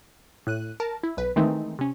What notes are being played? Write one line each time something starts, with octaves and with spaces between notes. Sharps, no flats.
A2 F#6 D#7
A#4 A5
E4
B1 B4
D#3 E3 G#3 A3 C4 D#4
C3 C#4